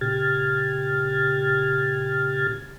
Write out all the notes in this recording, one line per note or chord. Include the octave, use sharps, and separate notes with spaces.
A#2 C#3 G4 F6 G#6 A6